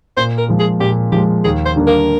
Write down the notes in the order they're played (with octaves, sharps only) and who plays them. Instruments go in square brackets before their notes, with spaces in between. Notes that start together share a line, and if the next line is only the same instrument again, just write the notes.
[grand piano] A#2 [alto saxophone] C5
[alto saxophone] A#4
[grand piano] F3 G#3
[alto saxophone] G#4
[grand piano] A#2 [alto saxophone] G4
[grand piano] F3 G#3 [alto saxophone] G4
[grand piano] D#2 [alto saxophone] G#4
[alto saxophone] C5
[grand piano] D3 G3 A#3 D4
[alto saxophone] A#4